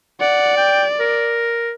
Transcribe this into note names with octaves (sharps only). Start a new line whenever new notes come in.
D5 F#5
G5
A#4